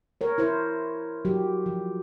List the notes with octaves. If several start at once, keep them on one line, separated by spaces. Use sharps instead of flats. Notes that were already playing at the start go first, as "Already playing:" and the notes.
A#4 C#5
E4 A#4 C5
F#3 F#4 G4
F3